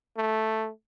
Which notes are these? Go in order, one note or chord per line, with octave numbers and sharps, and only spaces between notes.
A3